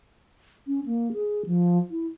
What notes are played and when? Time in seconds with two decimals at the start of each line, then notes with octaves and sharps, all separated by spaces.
0.67 C#4
0.86 A#3
1.13 G#4
1.46 F3
1.91 E4